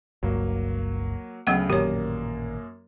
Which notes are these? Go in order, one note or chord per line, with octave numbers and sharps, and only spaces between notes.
G1 C#2 G2 F#3 A#3
D2 C#3 F#3 B3 F#5
A1 F#2 A#2 D#3 A#3 G4 C#5